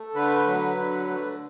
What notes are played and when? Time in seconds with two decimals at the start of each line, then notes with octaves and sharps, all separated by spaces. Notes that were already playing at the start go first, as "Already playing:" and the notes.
Already playing: A3
0.14 D3 B4
0.47 F#3
0.77 D3
1.09 A3